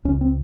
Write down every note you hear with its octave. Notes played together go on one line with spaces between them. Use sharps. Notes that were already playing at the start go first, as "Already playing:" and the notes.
C#2 C#3 C#4
C4